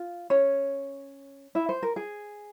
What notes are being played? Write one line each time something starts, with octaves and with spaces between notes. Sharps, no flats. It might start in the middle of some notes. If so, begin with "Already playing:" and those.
Already playing: F4
C#4 C#5
E4 E5
C5
A#4
G#4